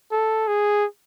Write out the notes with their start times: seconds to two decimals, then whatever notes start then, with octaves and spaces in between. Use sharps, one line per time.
0.12 A4
0.47 G#4